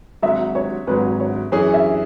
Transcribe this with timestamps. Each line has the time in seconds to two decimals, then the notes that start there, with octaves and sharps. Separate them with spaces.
0.22 G#1 G#2 F#3 E5
0.55 C#5
0.87 G#1 G#2 F#3 B4
1.20 C#5
1.52 F#2 E3 C#4 G#4 C#5
1.74 E5